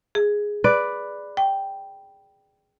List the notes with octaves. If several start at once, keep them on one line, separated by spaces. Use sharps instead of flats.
G#4
B4 D5
G5